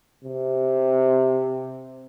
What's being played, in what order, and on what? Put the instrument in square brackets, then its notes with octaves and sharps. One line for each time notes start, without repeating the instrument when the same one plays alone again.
[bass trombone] C3